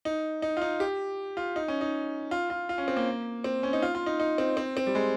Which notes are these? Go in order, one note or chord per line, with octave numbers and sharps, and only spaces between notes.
D#4
D#4
F4
D#4
G4
F4
D#4
C#4
D#4
F4
F4
F4
C#4
C4
A#3
C4
C#4
D#4
F4
F4
D#4
D#4
C4
C4
C4
G3
G#3